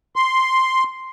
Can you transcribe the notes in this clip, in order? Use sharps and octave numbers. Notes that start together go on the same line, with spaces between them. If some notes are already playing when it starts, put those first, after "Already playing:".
C6